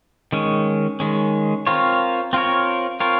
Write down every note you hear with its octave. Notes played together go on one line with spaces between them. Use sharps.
D#3 G#3 C#4
D#3 G#3 C#4
C4 F4 A#4 C#5
C4 F4 A#4 C#5
C4 F4 A#4 C#5